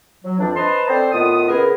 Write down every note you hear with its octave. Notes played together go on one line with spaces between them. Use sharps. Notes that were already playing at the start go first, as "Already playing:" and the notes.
F#3
F2 E3 F3 D4
B4 C5 D#5 A5 A#5 C6
C4 D4 A4 C5
A2 D#3 B3 F4 D#6
C#3 B3 E4 G#4 A#4